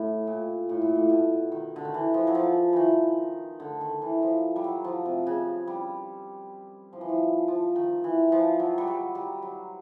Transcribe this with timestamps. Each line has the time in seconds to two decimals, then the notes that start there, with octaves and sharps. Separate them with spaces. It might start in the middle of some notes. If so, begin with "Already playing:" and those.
Already playing: A2
0.27 A#2
0.69 A2
0.81 A#2
0.95 A2
1.10 B2
1.52 D#3
1.76 D3
1.85 D#3
1.94 E3
2.14 F3
2.27 F#3
2.35 F3
2.73 D#3 E3
3.60 D3
3.81 D#3
4.02 E3
4.22 F3
4.56 G3
4.64 F#3
4.84 F3
5.05 C3
5.27 C#3
5.67 G3
6.93 F3
7.01 E3
7.09 F3
7.48 F3
7.76 D#3
8.04 E3
8.32 F3
8.60 F#3
8.78 G3
8.87 F#3
9.15 G3
9.42 F#3